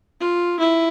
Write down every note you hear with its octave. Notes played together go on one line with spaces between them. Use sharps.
F4
E4